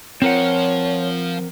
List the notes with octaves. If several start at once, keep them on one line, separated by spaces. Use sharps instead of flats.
F3 C4 A#4 C#5 F#5